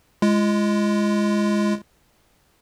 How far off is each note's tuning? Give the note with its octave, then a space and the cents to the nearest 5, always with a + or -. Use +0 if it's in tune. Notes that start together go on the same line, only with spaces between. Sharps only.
G#3 +0 F4 -40